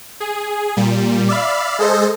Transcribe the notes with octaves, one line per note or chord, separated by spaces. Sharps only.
G#4
A#2 G3
D5 E5 F5 B5
G#3 G#4 A4 C5 D#5